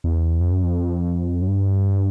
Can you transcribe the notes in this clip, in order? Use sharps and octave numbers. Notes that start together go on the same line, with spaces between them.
E2
F2
F#2
F2
F#2
G2